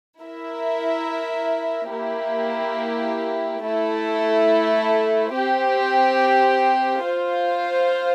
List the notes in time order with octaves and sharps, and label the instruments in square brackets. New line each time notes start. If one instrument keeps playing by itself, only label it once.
[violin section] E4 A#4 E5
A#3 E4 G4
A3 E4 A4
C4 G4 C5
F4 C5 F5